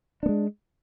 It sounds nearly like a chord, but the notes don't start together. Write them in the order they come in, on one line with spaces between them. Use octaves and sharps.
D4 B3 G#3